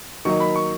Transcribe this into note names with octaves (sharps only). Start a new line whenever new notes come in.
D#3 F#3 A#3 D#4 C#6
B5
C#6